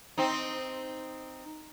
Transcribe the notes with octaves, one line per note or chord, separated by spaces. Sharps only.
C4 D#4